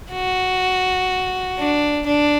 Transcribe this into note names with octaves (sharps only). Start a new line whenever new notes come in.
F#4
D4
D4